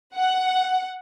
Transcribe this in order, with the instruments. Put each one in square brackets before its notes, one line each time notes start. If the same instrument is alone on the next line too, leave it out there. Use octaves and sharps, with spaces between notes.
[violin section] F#5